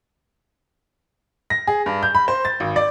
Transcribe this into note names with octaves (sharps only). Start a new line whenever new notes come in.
A#6
G#4
G2
G6
B5
C5
A6
G#1
D5